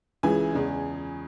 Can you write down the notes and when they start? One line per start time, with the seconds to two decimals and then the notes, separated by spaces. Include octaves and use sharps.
0.23 C#2 C#3 E3 G#5
0.53 E2 C#3 G#3